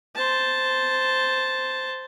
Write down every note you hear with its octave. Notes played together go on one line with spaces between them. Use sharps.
C5 A5